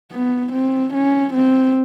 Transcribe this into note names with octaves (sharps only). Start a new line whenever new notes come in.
B3
C4
C#4
C4